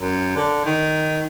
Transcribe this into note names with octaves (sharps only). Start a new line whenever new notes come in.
F#2
D3
D#3